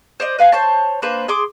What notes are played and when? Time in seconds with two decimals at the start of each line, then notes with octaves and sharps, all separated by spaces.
0.20 C5 D5 D#5
0.39 B4 F5 F#5 G#5
0.52 C5 C#5 A5
1.02 A#3 D4 B4 C5
1.28 G#4 C6 D6